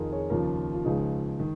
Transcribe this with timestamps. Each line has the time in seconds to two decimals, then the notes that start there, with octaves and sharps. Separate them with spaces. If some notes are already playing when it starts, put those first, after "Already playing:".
Already playing: F2 D#3 D#4 F4 G#4 A#4
0.12 G#4 C#5
0.30 D#2 C#3 F3 F4 A#4
0.74 F4
0.84 C#2 C#3 F3 D#4 G#4
1.39 D#3